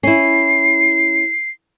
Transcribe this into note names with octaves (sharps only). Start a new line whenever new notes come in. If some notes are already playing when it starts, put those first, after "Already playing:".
C#4 E4 C7